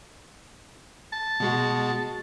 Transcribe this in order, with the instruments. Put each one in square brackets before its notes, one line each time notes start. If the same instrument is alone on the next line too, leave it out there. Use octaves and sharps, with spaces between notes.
[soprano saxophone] A5
[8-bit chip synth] B2 G#3 F#4